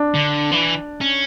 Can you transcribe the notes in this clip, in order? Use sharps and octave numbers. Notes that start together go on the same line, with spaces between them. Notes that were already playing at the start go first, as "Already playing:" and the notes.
Already playing: D4
D3
E3
C#4